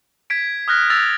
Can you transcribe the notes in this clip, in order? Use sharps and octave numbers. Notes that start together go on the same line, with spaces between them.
G#6 B6 D7
D#6 F6 F#6 A#6
E6 A6 A#6 F7